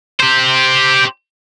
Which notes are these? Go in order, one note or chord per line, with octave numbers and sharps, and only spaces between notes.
G4 C5